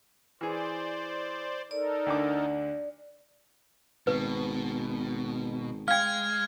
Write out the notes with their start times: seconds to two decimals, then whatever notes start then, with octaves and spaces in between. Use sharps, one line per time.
0.41 E3 G#4 C5 D5
1.71 D#4 A4 A#4 D5
2.06 D2 D3 D6
4.07 G#1 B2 B4
5.88 G#3 F5 G5 F6 G#6